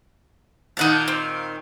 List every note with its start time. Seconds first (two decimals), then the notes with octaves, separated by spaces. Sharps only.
0.77 A#2 D#3 D#4 F#5 A5
1.08 C4